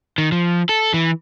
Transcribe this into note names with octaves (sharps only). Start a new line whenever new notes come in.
D#3
F3
A4
E3